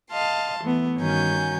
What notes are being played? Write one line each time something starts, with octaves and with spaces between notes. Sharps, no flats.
D#5 F5 A5 C6
E3 A3 B3
G2 D#3 C#4 F#4 G#5 G6